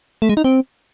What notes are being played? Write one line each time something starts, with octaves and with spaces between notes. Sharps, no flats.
A3
G#3
D#4
C4